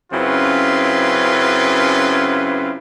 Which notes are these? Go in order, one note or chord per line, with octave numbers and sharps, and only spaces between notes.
F#2 C#3 C4 E4 F4 B4